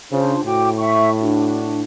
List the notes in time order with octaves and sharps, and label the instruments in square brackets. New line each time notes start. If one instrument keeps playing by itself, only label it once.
[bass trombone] C#3 [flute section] D4 F4 C5
[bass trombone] A2 [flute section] F#4 G5 D6
[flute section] E5 C#6
D4 F#4